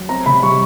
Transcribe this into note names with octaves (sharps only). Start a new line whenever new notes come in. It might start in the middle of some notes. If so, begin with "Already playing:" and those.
Already playing: F#3
C4 A#5
C3 B5
G3 C#6